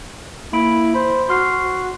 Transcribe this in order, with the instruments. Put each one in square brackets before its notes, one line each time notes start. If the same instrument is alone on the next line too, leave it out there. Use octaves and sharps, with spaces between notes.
[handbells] A#3 B5 D7 [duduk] E4
[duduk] C5 [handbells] B5
[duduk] F#4 [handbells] C6 F6 C7